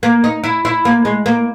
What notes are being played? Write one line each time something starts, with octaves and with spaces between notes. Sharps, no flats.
A#3
D#4
E4
E4
A#3
G#3
A#3